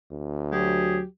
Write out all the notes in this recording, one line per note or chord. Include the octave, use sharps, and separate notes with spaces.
D2
F#3 G4 G#4